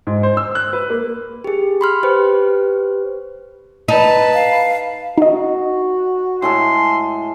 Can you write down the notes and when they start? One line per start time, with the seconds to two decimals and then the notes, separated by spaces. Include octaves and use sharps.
0.07 G#2
0.23 C5
0.37 E6
0.55 F#6
0.73 B4
0.90 A#3
1.44 G4 G#4
1.81 B5 C6 F6
2.03 G4 B4 C5
3.88 D#4 B4 A5
4.34 F5
5.18 D#4 F#4 D#5
6.42 A2 G#3 A4 C6